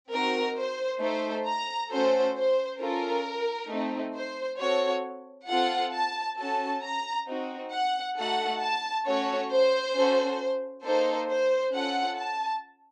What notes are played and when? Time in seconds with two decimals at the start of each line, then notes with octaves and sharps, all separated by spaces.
0.12 C4 D#4 F#4 A#4
0.57 C5
1.01 A3 D#4 A4 C5
1.46 A#5
1.91 A3 C#4 F#4 A4 C5
2.36 C5
2.80 C#4 F4 A4 A#4
3.70 A3 C4 D#4
4.15 C5
4.59 C4 F#4 A4 C#5
5.48 C4 F4 A4 F#5
5.93 A5
6.38 C#4 F#4 A4 A5
6.83 A#5
7.27 C4 D#4 F#4
7.72 F#5
8.16 A3 D#4 F#4 A4 F#5
8.61 A5
9.06 A3 C#4 F#4 A4 C#5
9.50 C5
9.95 C#4 F#4 A4
10.84 A#3 D#4 A4 C5
11.29 C5
11.74 C#4 F4 A4 F#5
12.19 A5